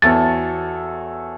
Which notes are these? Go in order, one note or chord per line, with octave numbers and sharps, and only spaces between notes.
E2 F#4 A4 C#5 A6